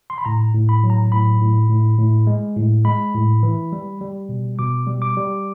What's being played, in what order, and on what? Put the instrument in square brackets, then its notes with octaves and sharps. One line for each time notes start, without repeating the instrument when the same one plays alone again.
[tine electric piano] C6
B5
A2 A#5
A2
B5
F#3
A#5
A2 B5
A2
A2
A2
G#3
A2
G#3 B5
A2
E3
G3
G3
B2
B2 D6
G3
D6
G3